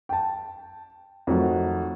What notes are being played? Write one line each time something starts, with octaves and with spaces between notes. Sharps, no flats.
G5 A5
F2 D#3 F#3 A3